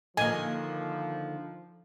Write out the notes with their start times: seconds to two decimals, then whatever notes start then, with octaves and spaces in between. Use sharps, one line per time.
0.17 D3 D#3 F3 A#3 D#5 G#5